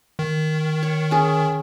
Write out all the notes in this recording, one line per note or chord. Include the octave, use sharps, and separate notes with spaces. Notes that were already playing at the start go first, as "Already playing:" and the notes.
D#3
C#5
C#4 G#4